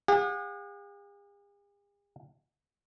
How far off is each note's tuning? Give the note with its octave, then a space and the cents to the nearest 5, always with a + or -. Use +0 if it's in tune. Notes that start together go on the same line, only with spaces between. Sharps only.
G#4 -45 F#5 -40